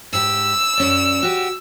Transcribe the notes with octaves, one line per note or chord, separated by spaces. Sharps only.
G#2 G4 E6
F#2 C#4 D5
F#4 G4